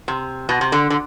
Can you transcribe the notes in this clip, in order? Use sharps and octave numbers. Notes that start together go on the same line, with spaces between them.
C3
B2
C3
D3
D3